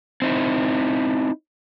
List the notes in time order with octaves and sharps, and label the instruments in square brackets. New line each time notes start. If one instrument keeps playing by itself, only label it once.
[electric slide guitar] C4 D#4 E4